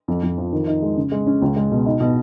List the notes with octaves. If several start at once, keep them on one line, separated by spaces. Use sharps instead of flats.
F2
F2
F3
D#3
D#4
G#3
C#3
G#3
C#4
C#2
G#3
B2
D#4
B2